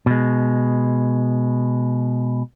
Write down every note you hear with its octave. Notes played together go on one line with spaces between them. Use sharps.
B2 G#3